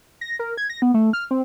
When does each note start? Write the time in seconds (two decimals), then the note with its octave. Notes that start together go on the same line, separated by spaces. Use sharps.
0.21 A#6
0.39 A#4
0.57 G#6
0.70 A#6
0.82 B3
0.94 A3
1.13 F6
1.31 C4